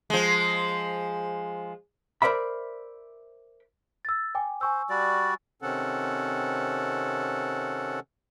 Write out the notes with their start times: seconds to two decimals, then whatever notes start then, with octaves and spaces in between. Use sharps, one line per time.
0.10 F3 G#3
2.22 A#4 C5 D5 E5 B5
4.05 E6 A6
4.35 G5 G#5 D6
4.61 C5 G#5 C#6 E6
4.89 G3 F#4 D5
5.62 C3 D#3 C4 C#4 A4 F#5